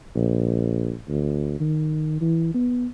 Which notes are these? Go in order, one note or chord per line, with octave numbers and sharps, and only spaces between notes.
A#1
D2
D#3
E3
B3